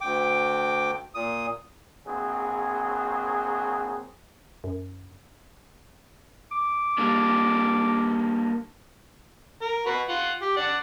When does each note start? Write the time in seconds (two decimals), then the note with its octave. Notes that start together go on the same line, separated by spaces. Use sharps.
0.01 D2 G5 D6
1.15 A#2 D#6
2.06 A#1 F#3 C4 G#4
4.64 F#2
6.52 D6
6.98 G3 A#3 D4
9.62 A#4
9.86 F#4 B4
10.09 F4 F#5
10.42 G4
10.57 D5 F#5